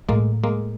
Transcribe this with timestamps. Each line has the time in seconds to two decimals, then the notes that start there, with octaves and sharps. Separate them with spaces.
0.09 A2 G#3 A#3
0.44 G#3 A#3